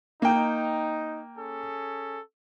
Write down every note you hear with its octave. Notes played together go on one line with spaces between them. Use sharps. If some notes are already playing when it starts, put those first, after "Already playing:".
A#3 D#4 G5
C#4 G#4 A4